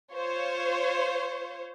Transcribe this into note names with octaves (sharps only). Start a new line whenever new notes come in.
F4 C5 C#5